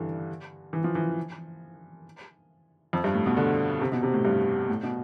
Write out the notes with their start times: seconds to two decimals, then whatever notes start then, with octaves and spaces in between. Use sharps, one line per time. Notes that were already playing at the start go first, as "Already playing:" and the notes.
Already playing: G2 D3 E3
0.73 E3
0.84 F3
0.95 E3
2.93 F2
3.04 G2
3.15 A2
3.26 B2
3.37 D3
3.81 C3
3.92 B2
4.03 C3
4.14 A2
4.25 G2
4.69 A2
4.83 B2